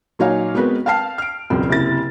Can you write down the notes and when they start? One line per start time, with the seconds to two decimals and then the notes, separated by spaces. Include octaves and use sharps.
0.19 A#2 F#3 D#4 C#5 F5 G#5
0.55 G#3 B3 C4 F#4 A#4 B4
0.86 F5 G5 A5 F6 C7
1.18 F6 D7
1.50 E1 C#2 F#2 C4
1.69 F#1 C3 E4 A6